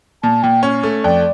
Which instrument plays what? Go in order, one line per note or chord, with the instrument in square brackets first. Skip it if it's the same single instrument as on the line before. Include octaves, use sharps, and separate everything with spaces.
[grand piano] A#2 [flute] A5
[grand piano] A#2 [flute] G5
[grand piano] C#4
A3
[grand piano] F2 [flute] D5